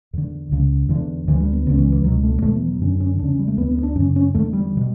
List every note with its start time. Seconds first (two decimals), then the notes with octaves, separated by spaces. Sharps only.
0.13 E2 D3
0.52 C#2 C#3
0.89 E2 D3
1.28 D2 D3 E3
1.40 G3
1.53 B3
1.66 C#3 B3
1.70 C#2
1.78 E3
1.92 E3
2.04 C#2 F#3
2.08 B2
2.23 A3
2.42 E2 B2 A3
2.55 E3
2.68 F#3
2.81 F#2 D3 C#4
3.00 C#4
3.19 C#3 D4
3.22 E2
3.29 C#4
3.39 G3
3.48 A3
3.57 D2 B3
3.61 D3
3.71 B3
3.83 D4
3.95 F#2 C#4
4.00 C#3
4.16 C#4
4.34 E2 D3 A3
4.53 G3
4.77 B2